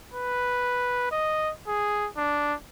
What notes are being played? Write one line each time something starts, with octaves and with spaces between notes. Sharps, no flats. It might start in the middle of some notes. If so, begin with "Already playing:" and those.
B4
D#5
G#4
D4